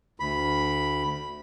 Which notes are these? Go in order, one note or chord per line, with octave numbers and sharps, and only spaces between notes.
D2 B5